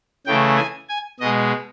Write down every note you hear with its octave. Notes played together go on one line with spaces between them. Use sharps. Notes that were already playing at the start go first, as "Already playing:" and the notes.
C#3 E3 A3 G5
G#5
G#5
B2 G#3 D#5